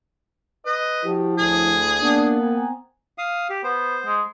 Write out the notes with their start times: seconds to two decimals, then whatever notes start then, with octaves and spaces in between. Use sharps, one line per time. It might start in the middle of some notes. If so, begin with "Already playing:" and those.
0.66 B4 D#5
1.05 F3 E4 F#4 G4
1.39 D2 A2 G#4
2.01 A#3 B3 D4
2.41 C4 G#5 A#5
3.18 F5 D#6
3.50 G4
3.64 B3 C5
4.06 G#3